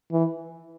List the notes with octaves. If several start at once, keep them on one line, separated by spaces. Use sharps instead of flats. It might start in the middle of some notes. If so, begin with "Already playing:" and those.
E3